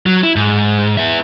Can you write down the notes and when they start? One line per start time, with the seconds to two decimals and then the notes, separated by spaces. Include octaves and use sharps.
0.06 F#3
0.23 E4
0.36 G#2
0.97 B3 E5